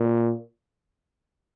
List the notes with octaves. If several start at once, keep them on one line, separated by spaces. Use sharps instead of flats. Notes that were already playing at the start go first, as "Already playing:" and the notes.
Already playing: A#2